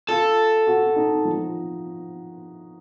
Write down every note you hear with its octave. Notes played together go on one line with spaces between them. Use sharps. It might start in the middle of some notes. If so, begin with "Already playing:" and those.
F4 A4
F#4
D#4
F3